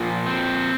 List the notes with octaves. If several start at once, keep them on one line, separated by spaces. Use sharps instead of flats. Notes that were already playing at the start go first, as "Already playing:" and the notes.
Already playing: A#2 F3
C4